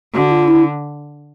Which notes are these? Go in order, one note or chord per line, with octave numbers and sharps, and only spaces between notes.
D3 F#4
F4
E4